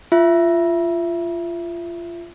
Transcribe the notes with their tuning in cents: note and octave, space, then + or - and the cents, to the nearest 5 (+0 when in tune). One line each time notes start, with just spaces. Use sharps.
F4 -20 E5 +10